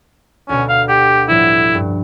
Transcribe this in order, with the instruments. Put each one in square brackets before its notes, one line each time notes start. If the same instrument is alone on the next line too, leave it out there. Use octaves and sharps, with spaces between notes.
[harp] D2 B2 [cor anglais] C#4
[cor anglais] F5
[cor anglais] G4 [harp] F#5
[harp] A2 F3 G3 [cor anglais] E4
[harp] G2